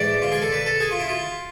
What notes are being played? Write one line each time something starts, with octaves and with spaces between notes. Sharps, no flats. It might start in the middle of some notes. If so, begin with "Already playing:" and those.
Already playing: A1 G#2 E3 D5
F4
G#4
A4
B4
A4
G#4
F4
E4
F4